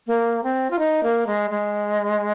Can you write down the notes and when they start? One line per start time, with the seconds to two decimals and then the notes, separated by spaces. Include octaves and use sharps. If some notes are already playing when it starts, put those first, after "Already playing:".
0.07 A#3
0.44 C4
0.71 F4
0.79 D#4
1.03 A#3
1.27 G#3
1.50 G#3